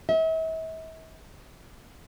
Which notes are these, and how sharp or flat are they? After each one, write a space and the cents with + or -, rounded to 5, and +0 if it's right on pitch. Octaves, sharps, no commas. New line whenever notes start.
E5 -40